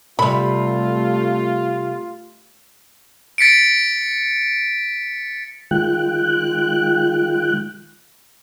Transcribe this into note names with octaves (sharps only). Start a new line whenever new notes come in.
C3 G3 A3 F4 B5
A6 B6 C#7 D7
D#3 G#3 F4 G5 F#6